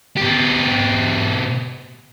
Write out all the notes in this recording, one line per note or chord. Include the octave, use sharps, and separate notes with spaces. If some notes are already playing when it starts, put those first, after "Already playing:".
B2 G4